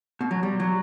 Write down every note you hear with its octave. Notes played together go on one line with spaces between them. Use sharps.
B2
F#3
G3
F#3